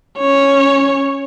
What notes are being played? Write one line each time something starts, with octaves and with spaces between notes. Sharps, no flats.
C#4 C#5